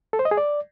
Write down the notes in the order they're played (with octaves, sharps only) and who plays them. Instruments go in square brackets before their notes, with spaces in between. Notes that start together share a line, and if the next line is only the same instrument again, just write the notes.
[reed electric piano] A4
C5
D#5
G#4
D5